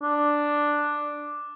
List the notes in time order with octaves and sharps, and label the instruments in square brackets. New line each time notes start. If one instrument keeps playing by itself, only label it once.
[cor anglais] D4